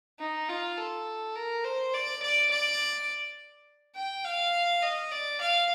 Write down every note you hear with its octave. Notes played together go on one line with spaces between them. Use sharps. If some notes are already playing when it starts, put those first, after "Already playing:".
D#4
F4
A4
A#4
C5
D5
D5
D5
G5
F5
D#5
D5
F5